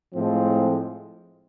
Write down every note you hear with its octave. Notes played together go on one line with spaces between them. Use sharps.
A2 F3 G#3 C4